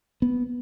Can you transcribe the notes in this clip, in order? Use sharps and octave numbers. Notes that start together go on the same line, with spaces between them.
B3